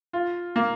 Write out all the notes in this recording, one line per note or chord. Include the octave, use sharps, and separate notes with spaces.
F4
A#3